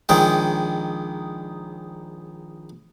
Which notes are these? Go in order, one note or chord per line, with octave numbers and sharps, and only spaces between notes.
A#1 D#3 G#3 G5